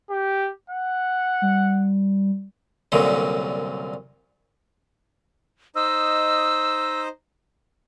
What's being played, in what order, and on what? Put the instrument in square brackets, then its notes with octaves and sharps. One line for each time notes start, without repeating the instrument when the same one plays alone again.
[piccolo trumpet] G4
F#5
[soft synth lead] G3
[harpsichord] C2 F#2 A#2 D3
[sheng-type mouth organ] D#4 C5 D#5 [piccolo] E6